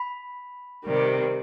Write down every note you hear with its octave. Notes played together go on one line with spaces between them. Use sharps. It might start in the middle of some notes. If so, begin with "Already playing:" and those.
Already playing: B5
C3 D#3 G3